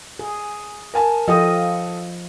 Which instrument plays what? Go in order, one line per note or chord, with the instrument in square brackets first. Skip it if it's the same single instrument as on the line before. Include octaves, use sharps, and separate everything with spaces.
[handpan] G#4
[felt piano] A#4 G#5 A5
[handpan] F3 F4 D#5 [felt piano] A4 G5 D#6